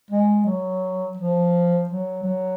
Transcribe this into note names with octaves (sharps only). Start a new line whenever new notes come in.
G#3
F#3
F3
F#3
F#3